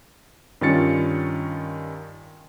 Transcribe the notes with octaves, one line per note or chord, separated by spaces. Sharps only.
G2 D#3 C#4 F4 A6 C#7